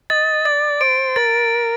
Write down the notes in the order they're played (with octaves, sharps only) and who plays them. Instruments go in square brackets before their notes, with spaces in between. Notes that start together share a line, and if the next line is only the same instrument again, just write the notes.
[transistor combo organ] D#5 [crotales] A6
[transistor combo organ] D5 [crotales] A6
[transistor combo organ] C5 [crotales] D7
[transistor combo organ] A#4 [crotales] A6